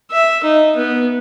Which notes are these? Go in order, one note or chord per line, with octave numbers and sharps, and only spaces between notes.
E5
D#4
B3